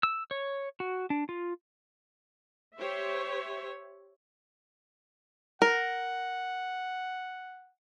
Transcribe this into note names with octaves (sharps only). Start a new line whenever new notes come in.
E6
C#5
F#4
D4
F4
G4 C5 C#5 E5
A#4 F#5